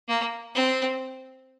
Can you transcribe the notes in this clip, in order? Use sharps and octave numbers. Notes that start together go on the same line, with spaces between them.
A#3
C4